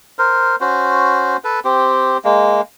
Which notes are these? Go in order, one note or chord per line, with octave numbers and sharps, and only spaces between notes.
A#4 C5
C#4 F#4 C5
A4 B4
C4 G4
G#3 A#3